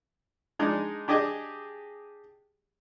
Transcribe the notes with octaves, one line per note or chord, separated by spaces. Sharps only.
G#3 D4 D#4
D4 G4 G#4 D#5